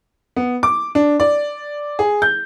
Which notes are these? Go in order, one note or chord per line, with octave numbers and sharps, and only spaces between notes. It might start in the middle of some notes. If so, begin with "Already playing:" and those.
B3
D6
D4
D5
G#4
G6